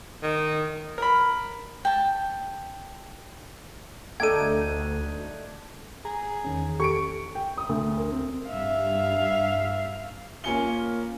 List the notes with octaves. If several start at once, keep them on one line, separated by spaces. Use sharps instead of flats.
D#3
A#4 B5
G5 A5
D2 A3 D4 D#4 A4 G5 G#6 D#7
G#4 A#5
E2 D#3 C#4
G4 A4 C#6 C#7 D7
G5
D#6
D2
A#4
C4
G2 E5 F5
A#3 C#4 F4 G#5 C#7 G7